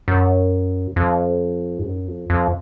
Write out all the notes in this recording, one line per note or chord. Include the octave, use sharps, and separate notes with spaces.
F#2
F2
G#2
F#2
F2
F2